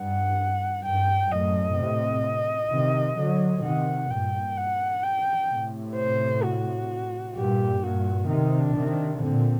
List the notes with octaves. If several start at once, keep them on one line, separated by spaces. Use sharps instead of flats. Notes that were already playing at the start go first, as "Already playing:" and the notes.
Already playing: G2 F#5
G2 G5
F#2 A2 D#5
A2 C3
C3 D#3
D3 F#3
C3 D#3 F#5
G2 A#2 G5
F#5
G5
A2 C3
C5
F#4
G2 A#2 G4
G2 A#2 F#4
C3 D#3 D#4
D4
C3 D#3
D4
A#2 D3 C4